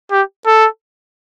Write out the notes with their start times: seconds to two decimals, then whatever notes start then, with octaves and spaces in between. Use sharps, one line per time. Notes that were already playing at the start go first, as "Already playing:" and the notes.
0.12 G4
0.46 A4